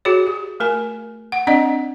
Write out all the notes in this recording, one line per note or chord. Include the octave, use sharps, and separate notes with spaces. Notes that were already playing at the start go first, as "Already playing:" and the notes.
F#4 G#4 C#5
G4
A3 A#4 G#5
F#5
C4 D4 D5 D#5 F#5